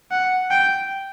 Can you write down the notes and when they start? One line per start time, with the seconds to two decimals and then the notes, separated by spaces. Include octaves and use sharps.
0.11 F#5
0.51 G5